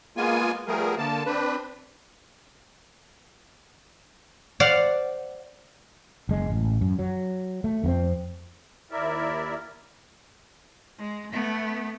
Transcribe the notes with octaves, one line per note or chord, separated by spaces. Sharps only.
G#3 A#3 B3 F4 G#5
F3 G3 A3 B3 G#4 A#4
D3 A#3 A5
C4 D4 B4
C5 D5 F5 F#5
F#1 G#3
A1
F#2
F#3
A3
F2 A#3 C4
D#2 E4 A#4 D5 E5
G#3
A3 B3